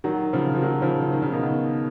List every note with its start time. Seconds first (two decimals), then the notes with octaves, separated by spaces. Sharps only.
0.04 D#3 F#3
0.33 C#3 F3
0.55 F3
0.62 D#3 F#3
0.82 C#3 F3
1.02 F3
1.12 D#3
1.22 C#3
1.32 B2 D#3